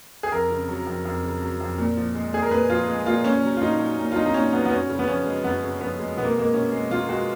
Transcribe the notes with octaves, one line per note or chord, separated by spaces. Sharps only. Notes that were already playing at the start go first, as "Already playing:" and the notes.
G#4
F2 A#4
C#3
F#3
F2
F2
C#3
F#3
F2
A#2
F3
G#3
A#2 G#4
A#4
A#2 B4
F3 F4
G#3
A#2 F4
A#2 C#4
F#3
F4
A#2 D#4
F#3
A#2
F4
F#3 D#4
D#4
A#2 C#4
F#3 B3
B3
F#2 C#4
C#3
B3
F3 C#4
G#3
F#2 B3
C#3
F3 B3
G#3
B2 B3
A#3
G#3 A#3
B2 C#4
G#3
B2 F4
G#3 F#4